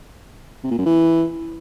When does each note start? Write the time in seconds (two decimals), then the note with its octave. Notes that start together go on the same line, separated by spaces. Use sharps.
0.64 C3
0.71 A#2
0.78 F#2
0.86 E3